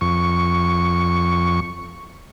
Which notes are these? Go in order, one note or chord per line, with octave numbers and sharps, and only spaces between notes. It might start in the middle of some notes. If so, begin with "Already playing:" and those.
F2 C#6